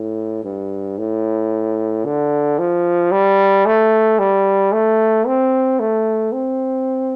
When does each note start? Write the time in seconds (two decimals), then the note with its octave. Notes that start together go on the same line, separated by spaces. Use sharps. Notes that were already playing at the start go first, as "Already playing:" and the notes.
Already playing: A2
0.45 G2
0.98 A2
2.05 D3
2.59 F3
3.12 G3
3.66 A3
4.19 G3
4.72 A3
5.27 C4
5.80 A3
6.32 C4